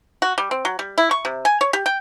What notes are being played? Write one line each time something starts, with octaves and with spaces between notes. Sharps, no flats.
F#4
G3
C4
F#3
G3
E4
C#6
C3
G#5
C#5
G4
G5